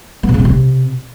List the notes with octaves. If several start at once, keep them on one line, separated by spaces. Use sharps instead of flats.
B3
C3
C#3
C4
C3